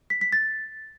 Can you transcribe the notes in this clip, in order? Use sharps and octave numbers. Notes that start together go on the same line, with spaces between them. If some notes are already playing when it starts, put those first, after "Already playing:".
B6
B6
A6